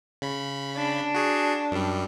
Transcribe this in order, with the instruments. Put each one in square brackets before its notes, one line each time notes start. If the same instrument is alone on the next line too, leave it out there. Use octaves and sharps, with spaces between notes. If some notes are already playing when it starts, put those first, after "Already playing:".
[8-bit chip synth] C#3 B5
[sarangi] D4
[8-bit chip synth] F#4 G#4
F#2 G3